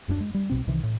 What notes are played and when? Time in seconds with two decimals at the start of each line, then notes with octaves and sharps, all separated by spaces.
0.08 D1 F#2 F3 D4
0.20 G#3
0.34 G3
0.50 B1 B2 C4
0.67 C2 C3 D#3 E3
0.83 A2